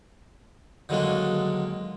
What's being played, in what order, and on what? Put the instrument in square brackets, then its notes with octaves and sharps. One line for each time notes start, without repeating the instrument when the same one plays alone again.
[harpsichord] D3 D#3 F#3 G#3 A#3 D4